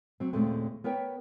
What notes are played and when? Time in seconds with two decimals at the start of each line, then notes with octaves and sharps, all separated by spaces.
0.20 F#3 C4
0.33 D#2 A#2 C#3 G#3 A3 C4
0.84 B3 A#4 B4 C#5 G5